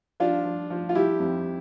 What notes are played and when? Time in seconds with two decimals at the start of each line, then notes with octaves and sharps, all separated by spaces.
0.20 F3 D4 F4
0.45 F3
0.70 F3
0.89 F4
0.95 F3 E4 G4
1.20 F2